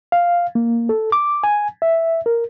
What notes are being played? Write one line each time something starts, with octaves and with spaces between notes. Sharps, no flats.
F5
A#3
A4
D6
G#5
E5
A#4